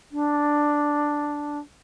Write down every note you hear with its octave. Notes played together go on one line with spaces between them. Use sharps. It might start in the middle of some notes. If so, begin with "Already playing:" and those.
D4